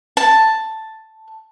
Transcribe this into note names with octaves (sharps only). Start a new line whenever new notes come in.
A5